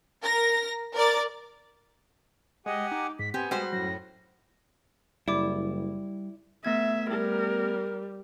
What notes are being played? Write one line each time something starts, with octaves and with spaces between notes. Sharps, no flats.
A#4 A#6
A#4 D5 A6
G#3 G4 D#5 F#5 G#5
D#4 D6
G#2 B6
B3 C4 G4 G#5
G3 G#3 F#4 C5
F#2 A2 A#6
F#1 G3 E4 D5 D6
A3 B3 E5 G#6
G3 A#4